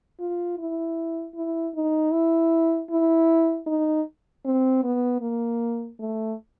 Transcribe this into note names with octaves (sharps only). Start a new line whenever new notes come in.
F4
E4
E4
D#4
E4
E4
D#4
C4
B3
A#3
A3